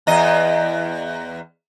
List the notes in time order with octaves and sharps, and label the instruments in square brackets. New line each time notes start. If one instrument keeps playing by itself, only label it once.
[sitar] E2 D#5